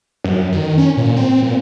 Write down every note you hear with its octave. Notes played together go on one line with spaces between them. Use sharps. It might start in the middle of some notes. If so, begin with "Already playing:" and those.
F#2
D#3
C#4
A#2
C4
A#2